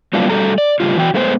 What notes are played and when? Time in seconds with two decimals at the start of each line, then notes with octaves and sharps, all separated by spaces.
0.13 F#3 G3 A#3 B3 D4 F4
0.30 G3 A3 F#4 A4 A#5
0.58 D5
0.80 A2 C#3 F#3 G3 F4
0.96 E3 F#4 G5
1.14 F#2 G#3 A3 B3 F4 C5